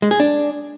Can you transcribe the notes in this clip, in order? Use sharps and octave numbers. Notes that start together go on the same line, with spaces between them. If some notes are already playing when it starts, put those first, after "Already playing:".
G#3
G#4
D4